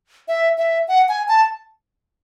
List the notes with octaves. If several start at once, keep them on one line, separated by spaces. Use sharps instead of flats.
E5
E5
F#5
G#5
A5